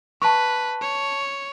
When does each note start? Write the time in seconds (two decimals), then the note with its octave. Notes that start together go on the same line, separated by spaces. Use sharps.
0.22 B4 A5 C#6
0.82 C#5